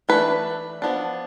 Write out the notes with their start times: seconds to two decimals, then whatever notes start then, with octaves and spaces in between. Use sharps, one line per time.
0.09 E3 A3 D4 B4
0.82 F3 B3 D4